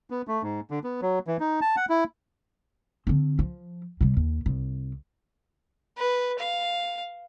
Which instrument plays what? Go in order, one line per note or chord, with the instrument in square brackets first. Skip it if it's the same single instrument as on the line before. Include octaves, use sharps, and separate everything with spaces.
[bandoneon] B3
A3
G#2
D3
B3
F#3
E3
D#4
A5
F#5
E4
[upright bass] D3 C4
F3
C3 G3
D#2
C2
[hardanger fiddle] B4
F5